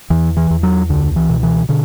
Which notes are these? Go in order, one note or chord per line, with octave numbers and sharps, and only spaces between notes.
E2 E3
E3
E2
F#3
C#2 D3
E3
B2
E3
B2 D3